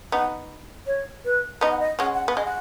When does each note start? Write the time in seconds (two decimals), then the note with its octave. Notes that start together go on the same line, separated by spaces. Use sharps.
0.12 B3 D#4 F#5
0.87 C#5
1.25 B4
1.61 B3 D#4 D#5
1.71 F#5
1.80 D#5
1.99 G#3 C#4 F#5
2.14 F#5
2.28 B3
2.36 G#3 D#5
2.45 F#5